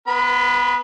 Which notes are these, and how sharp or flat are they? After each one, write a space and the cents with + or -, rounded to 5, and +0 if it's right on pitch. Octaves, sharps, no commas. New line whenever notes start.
B3 +0 B4 -25 B5 +35